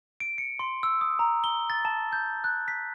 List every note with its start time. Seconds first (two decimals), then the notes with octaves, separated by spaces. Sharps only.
0.20 D7
0.38 C#7
0.59 C6
0.83 E6
1.01 D#6
1.19 A#5
1.44 G7
1.70 A6
1.85 A5
2.13 G6
2.44 F#6
2.68 B6